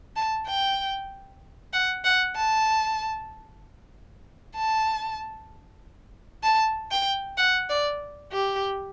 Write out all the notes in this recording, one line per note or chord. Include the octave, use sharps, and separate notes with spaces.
A5
G5
F#5
F#5
A5
A5
A5
G5
F#5
D5
G4